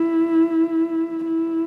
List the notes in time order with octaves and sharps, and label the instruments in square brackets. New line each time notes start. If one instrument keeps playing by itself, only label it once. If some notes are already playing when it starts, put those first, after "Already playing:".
Already playing: [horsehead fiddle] E4
E4